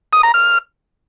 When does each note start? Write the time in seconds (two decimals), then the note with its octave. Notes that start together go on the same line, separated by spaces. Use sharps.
0.13 D#6
0.23 A#5
0.34 F6